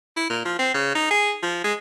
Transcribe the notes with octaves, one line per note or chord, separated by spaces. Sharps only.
E4
A#2
F3
C4
C#3
D#4
G#4
F3
G#3